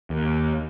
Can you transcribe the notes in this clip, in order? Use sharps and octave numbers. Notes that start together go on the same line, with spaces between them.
D#2